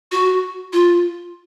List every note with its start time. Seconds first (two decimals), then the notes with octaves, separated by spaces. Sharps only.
0.12 F#4
0.73 F4